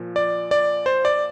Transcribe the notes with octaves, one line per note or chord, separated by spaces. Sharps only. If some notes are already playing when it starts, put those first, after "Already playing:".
Already playing: A#2 F3
D5
D5
C5
D5